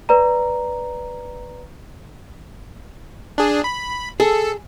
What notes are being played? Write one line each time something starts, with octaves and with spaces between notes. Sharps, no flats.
B4 D5 A#5
D4 G#4
B5
G#4 A4